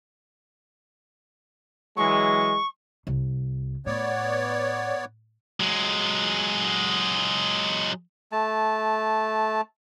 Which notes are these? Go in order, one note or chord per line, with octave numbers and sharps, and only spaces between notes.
E3 F#3 G#3 C#6
C2
A2 B3 C#5 D5
F#3 G#3
A3 A5